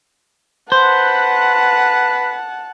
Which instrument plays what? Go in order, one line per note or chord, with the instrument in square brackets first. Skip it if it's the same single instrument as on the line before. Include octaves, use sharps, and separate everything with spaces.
[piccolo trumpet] B4 [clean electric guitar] C5 [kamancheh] F#5 A5